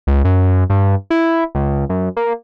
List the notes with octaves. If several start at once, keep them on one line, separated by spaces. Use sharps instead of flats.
C#2
F#2
G2
E4
C#2
F#2
A#3